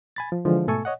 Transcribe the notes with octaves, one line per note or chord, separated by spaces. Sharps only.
G#5 B5 A6
F3
D3 E3 F3 G#3
G#2 B2 A3 A4 G#5 C#6
C#5 D#5 F#5